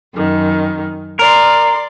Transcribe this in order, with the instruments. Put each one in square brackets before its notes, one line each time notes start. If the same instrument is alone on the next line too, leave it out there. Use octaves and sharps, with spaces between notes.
[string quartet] F#2 D#3
[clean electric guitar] A#4 [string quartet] D5 C6